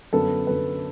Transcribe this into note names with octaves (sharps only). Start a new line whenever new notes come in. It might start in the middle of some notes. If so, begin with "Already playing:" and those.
F#2 D3 B3 A4
F#2 D3 B3 B4